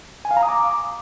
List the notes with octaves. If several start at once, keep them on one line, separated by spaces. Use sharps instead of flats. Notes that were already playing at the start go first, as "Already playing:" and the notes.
G#5
F5
A#5
D#6
D6